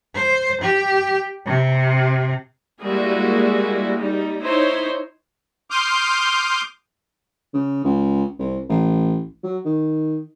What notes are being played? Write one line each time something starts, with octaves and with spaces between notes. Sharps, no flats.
C5
G4
C3
G3 G#3 A#3 E4 F#4 G#4
G3 D#4
D#4 E4 C5 C#5
C6 D6 D#6 F6 G6
C#3
C#2
C2
A1
F#3
D#3